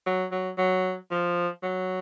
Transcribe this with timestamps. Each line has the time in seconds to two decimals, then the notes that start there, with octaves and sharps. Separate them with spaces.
0.07 F#3
0.32 F#3
0.58 F#3
1.11 F3
1.63 F#3